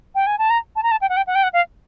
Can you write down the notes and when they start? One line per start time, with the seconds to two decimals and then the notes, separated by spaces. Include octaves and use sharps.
0.15 G5
0.26 G#5
0.38 A5
0.50 A#5
0.76 A5
0.83 A#5
0.91 A5
1.01 G5
1.09 F#5
1.17 G5
1.27 F#5
1.35 G5
1.43 F#5
1.53 F5